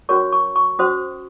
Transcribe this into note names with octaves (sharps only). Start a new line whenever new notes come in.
C#4 F#4 A#4 C#5 C#6
C#6
C#6
C#4 F#4 C5 D#6